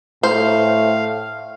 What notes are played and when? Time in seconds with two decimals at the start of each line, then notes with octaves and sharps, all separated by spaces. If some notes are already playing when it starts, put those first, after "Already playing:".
0.23 A2 C5 F5